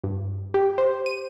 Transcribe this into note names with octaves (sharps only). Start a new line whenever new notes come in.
G2
G4
C5
D#7